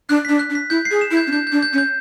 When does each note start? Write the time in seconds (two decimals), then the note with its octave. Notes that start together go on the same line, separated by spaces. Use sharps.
0.09 D4 F#6
0.25 D4 B6
0.39 F#6
0.50 D4
0.55 B6
0.70 E4 G6
0.85 C7
0.91 G#4
1.01 E7
1.11 E4
1.17 G6
1.27 C#4
1.31 D4 G6
1.47 G6
1.52 D4
1.63 G6
1.73 C#4
1.78 G6